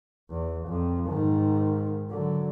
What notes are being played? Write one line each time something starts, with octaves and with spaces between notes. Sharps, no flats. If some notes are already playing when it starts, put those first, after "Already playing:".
E2
F2
G#2 D#3
D3 F#3